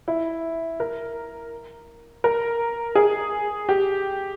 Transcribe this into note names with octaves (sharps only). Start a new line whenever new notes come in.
E4
A#4
A#4
G#4
G4